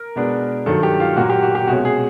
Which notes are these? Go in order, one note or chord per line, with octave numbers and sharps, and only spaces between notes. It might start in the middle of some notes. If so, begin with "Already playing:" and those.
Already playing: A#4
B2 G#3 B3 D4
G2 D#3 F#3 A4
G4
F4
A#2 F#3 A#3 F#4
G4
F#4
G4
C2 B2 G#3 C#4 F#4
G#4